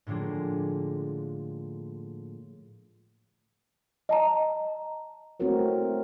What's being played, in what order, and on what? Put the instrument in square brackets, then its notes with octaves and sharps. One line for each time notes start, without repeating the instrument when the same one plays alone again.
[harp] A2 D3 F3 G#3 A#3
[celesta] D#5 A5 A#5
[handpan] A3 C4 E4 F#4 A#4 C#5